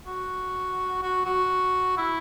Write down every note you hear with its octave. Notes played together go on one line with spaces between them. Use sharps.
F#4
F#4
F#4
E4